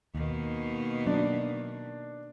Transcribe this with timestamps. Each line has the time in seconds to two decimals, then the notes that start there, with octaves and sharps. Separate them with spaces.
0.15 D#2 B2 D#3 A#3
1.07 F#3 D4